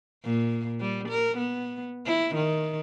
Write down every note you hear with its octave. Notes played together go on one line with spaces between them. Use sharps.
A#2
G3
A#4
B3
E4
D#3